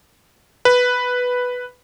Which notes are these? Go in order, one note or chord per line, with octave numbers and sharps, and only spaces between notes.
B4